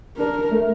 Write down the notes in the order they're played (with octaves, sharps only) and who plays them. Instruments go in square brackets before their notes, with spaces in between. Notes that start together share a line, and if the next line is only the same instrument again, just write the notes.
[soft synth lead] D4 [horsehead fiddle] A#4
[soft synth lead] A3